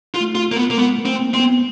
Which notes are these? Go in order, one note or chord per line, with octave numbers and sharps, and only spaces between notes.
F4
A3
F4
A#3
B3
A#3
G#3 B3
A3
C4
A#3
C4
B3